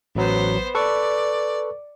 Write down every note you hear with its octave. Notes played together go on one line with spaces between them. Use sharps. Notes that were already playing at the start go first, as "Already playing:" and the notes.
A1 F#3 B3 C5
A4 B4 D5 C#6